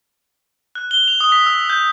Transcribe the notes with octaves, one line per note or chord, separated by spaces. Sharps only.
F#6
G7
F7
D#6
B6
E6
G6